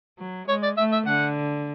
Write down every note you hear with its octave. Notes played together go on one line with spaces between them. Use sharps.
F#3
G#3 C#5
D5
A3 E5
E5
D3 F#5